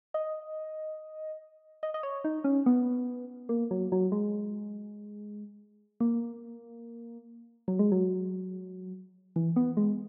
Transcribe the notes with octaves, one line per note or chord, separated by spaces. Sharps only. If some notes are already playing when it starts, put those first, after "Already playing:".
D#5
D#5
D#5
C#5
D#4
C#4
B3
A#3
F#3
F#3
G#3
A#3
F#3
G#3
F#3
E3
B3
G#3